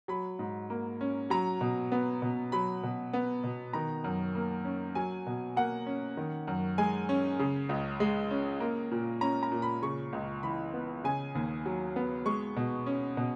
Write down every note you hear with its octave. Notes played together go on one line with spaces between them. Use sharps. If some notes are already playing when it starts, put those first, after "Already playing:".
F#3 B5
G#2
A#3
C#4
F#3 A#5
B2
B3
B2
F#3 B5
B2
B3
B2
D#3 A#5
F#2
A#3
C#4
F#3 G#5
B2
A#3 F#5
C#4
D#3
F#2
G#3 G#5
C#4
C#3
C#2
G#3
C#4
A#3
A#2
C#4 A#5
A#5
A#2
B5
C#3 C#6
C#2
E3 B5
B3
C#3 G#5
D#2
F#3
B3
G#3 C#6
B2
C#4
B2